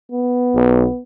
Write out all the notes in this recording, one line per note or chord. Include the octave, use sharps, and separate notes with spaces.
B3
B1